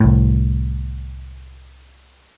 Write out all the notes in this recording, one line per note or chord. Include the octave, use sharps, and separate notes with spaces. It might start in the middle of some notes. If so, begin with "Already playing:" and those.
C2 A2